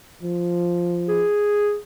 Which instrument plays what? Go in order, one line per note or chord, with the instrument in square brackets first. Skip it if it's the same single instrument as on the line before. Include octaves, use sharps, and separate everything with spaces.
[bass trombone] F3
[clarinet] G#4